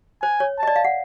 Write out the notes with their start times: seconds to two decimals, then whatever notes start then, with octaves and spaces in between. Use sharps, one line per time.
0.22 C5 G#5
0.40 C#5
0.58 D#5 A5
0.68 D5
0.76 F5
0.85 F#5